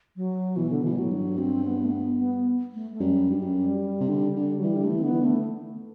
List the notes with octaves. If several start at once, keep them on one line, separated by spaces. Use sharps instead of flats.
F#3
B2 E3
D3
B2 E3
G3
A2 F#3
G2
C4
B3
A3
B3
B3
A3
A3
F#2 G3
G2
F#2
C3
D3
D3
F#3
E3 G3
D3
A3
E3
C4
D3 B3
E3
D3 A3